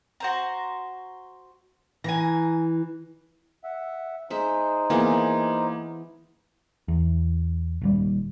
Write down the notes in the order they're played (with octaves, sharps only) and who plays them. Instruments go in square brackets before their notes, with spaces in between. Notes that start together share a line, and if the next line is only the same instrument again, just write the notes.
[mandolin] F#4 C5 A#5
[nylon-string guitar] E3 [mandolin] G#5 A#5
[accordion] E5 F#5
[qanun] G#3 E5 [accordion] D#4 C5
[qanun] E3 B3 G#4 [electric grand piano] A#3
[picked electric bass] E2
D#1 D#2 G3